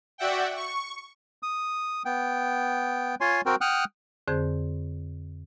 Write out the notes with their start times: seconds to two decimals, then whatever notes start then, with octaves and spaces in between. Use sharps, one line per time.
0.18 F#4 D5 E5 F#5 G5
0.55 C#6
1.43 D#6
2.05 B3 G5
3.21 F4 C#5 G#5 C6
3.46 C4 F#4 A#4 G5
3.61 F#5 G5 D#6 F6 F#6
4.28 F2 D3 C4 G#4 C5 G6